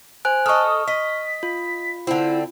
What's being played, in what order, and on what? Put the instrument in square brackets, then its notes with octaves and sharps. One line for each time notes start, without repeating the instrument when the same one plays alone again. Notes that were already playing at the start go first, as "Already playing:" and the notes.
[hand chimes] C5 G#5 F#6
[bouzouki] A4 D#5 [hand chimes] C#6 F6 [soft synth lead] D#6
[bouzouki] D#5 [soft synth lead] B6
[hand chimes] F4
[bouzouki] D3 C4 [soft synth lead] E4